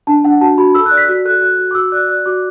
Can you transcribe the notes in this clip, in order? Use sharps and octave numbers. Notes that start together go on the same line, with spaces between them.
D4 A5
D4 F#5
F#4 A5
F#4 B5
A4 E6
F#6
D5
B6
F#4
A4 F#6
F#4 F#6
F#4
D6
F#4 E6
D5 F#6
D5 F#6
F#4 D6